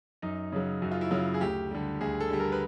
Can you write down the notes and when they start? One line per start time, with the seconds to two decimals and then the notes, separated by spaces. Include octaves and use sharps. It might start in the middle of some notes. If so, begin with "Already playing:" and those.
0.22 F#2 D#4
0.52 C#3 F#3
0.82 F#2 F#4
0.91 F4
1.01 E4
1.11 C#3 F#3 F4
1.34 G#4
1.41 D2 G4
1.71 D3 G3
2.01 D2 G#4
2.21 A4
2.30 D3 G3
2.40 A#4
2.52 B4